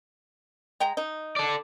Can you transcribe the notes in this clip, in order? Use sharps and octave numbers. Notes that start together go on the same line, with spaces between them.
G#3 G5 A#5
D#4
A4 D5